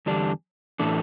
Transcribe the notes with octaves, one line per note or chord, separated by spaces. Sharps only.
E2 D3 G3 D4
A2 E3 A3 D4 A4